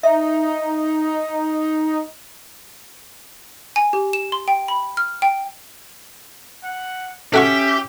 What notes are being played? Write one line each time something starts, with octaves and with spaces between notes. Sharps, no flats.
D#4 E5
G#5
G4
E7
C6
G5
B5
F6
G5
F#5
A3 C#4 F#4 G4 E5 C#6